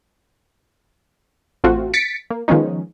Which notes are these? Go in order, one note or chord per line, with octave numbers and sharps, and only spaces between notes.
A1 A3 C4 F4 F#4
A6 B6 C#7 D7
A#3
D#3 F3 G#3 B3 C#4 D#4